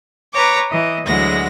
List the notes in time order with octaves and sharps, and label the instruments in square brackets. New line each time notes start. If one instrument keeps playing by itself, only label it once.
[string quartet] B4 C#5 A#5 D6
E3 D#5
D2 E3 F#3 G#3 F#5 A#6